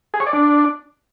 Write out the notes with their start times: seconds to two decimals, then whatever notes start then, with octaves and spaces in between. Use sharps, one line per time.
0.14 G#4
0.20 C#5
0.27 D5
0.33 D4